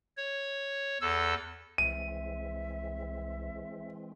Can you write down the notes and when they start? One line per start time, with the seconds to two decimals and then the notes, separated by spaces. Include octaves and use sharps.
0.17 C#5
1.01 E2 A4 E6
1.78 C2 E3 G#3 C4 E5 D#7